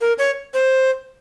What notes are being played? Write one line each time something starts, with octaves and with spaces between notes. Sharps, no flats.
A#4
C#5
C5